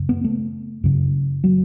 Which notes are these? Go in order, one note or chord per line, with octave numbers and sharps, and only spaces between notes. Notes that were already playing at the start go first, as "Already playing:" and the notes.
Already playing: F#2 C#3
B3
A3
F#2 C#3
F#3